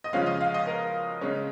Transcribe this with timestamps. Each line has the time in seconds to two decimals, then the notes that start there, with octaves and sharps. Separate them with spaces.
0.04 D#5
0.13 C#3 F3 G#3 C#4 F5
0.26 D#5
0.41 F5
0.54 D#5
0.67 A#4
1.21 C#3 G#3 C#4